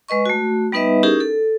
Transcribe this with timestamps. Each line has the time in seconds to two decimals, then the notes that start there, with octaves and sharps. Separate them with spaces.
0.08 G#3 B4 D#5 C#6
0.26 A3 F#4
0.72 G3 B3 D#4 B4 D#5 E5
1.03 C#4 D#4 E4 G4 G#4 A#4
1.20 A4